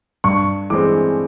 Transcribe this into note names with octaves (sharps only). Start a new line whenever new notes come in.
G2 C#6
E3 G#3 C4 D6